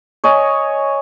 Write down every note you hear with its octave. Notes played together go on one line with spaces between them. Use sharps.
C#5 D#5 G#5